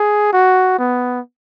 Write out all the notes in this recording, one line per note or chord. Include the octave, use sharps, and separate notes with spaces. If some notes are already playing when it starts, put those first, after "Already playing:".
Already playing: G#4
F#4
B3